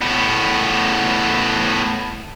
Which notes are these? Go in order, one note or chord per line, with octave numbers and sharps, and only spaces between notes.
A2 B3